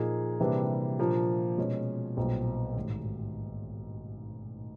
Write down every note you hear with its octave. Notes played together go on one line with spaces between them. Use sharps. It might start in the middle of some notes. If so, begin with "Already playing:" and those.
Already playing: A#2 F3 A#3 D#4 G#4
C3 E3 G3 A#3 D4
A#2 F3 A#3 D4 G4
B2 G#3 C#4
B1 A#2 G3 C4
A1 G#2 D#3